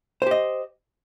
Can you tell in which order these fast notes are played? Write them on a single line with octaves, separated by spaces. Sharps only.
C5 G4 D#5